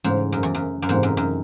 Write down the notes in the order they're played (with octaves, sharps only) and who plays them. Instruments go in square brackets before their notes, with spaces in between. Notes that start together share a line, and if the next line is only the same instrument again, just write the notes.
[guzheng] G#2 [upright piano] C#3 E3 A3 C#4
[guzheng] F#2
E2
F#2
F#2
[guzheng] G#2 [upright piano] C3 E3 A3 C4 D#4
[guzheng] F#2
F#2